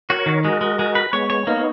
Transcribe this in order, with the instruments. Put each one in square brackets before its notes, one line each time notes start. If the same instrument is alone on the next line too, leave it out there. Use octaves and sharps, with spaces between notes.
[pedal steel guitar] F#4 [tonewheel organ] A#4 C#5
[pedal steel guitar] D#3
[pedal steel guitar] G#3 [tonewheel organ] F#4 A#4
[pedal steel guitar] G#3
G#3
B4
[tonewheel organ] G#3 B3 [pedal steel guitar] C#5
[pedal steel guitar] C#5
[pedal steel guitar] A#3 [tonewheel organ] B3 D#4